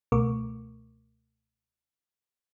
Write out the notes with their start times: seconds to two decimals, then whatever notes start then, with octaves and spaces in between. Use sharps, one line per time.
0.12 C#2 B2 A3 A#4 C#6 D6